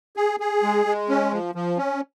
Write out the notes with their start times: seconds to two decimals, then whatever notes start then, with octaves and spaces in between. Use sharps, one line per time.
0.16 G#4
0.40 G#4
0.63 G#3
0.85 G#3
1.09 C#4
1.32 F3
1.55 F3
1.78 C#4